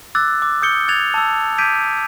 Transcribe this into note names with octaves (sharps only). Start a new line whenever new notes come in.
D6 E6 F#6 A6
D6
D#6 G6 C#7 G7
F#6 G#6 A6 F7
A5 E6
D6 G6 G#6 B6 D7 D#7